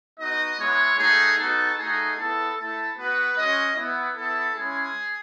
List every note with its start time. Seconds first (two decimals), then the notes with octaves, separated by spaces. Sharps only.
0.19 B3 D#4 F#4 D#5
0.58 G#3 B3 E4 C#5
0.98 A3 D#4 F#4 G#4
1.38 B3 D#4 F#4 A4
1.78 A3 D#4 F#4 G#4
2.17 B3 E4 A4
2.57 A3 E4 A4
2.97 B3 F#4 B4
3.36 G#3 C#4 F#4 D#5
3.76 B3 E4
4.16 B3 E4 A4
4.55 G#3 C#4 E4 G#4